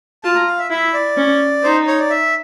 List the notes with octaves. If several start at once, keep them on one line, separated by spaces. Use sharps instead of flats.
F4 A5
A#5
F5
E5
E4 E5
D5
C#4
D#4 C5
C#5
D5
E5